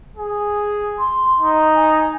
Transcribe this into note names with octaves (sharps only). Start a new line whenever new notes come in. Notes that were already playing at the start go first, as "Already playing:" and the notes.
G#4
C6
D#4
G#5